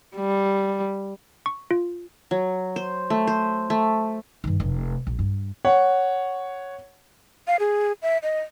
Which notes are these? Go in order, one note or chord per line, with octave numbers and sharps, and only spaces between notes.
G3
C#6
F4
F#3
C5
A3
C5
A3
G2 D#3
F1
A#1
G2
C#5 F#5
F5
G#4
E5
D#5